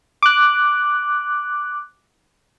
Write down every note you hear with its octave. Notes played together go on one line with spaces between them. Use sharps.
D6 F#6